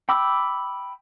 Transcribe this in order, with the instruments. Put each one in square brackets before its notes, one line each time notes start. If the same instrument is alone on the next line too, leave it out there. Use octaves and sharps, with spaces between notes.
[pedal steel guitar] G5 B5 D6 E6